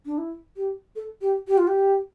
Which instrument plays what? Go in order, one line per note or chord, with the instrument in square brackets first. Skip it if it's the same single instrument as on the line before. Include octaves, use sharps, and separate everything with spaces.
[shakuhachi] D4
E4
G4
A4
G4
G4
F4
G4